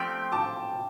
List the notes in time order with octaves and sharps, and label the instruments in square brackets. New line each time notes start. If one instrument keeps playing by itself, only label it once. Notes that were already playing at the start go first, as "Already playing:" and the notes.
Already playing: [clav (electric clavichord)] F3 A3 C4 G4 D5 [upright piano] G5 C6
[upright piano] A5 D6